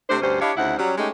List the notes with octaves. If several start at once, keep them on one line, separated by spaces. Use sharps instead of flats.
C3 A3 D4 C5
D2 G2 G3 C#4 C5
D4 E4 G4 C#5 D#5 F5
D2 C#3 D#4 E4 C5 F#5
F#3 G3 C#4
G#3 A3 C#4 D#4 G4